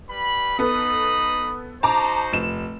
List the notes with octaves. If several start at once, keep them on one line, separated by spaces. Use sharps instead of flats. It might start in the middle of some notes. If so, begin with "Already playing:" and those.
G3 B4 B5
B3 D#4 A4 B4 B5 D#6
D#4 F#4 C5 A5 A#5 D6
F1 E7